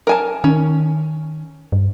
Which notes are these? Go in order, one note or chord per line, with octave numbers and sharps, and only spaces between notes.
A#4 G#5 A5
D#3 C#4
G2